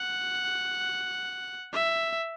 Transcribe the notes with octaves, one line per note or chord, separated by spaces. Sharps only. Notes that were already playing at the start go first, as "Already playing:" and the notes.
Already playing: F#5
E5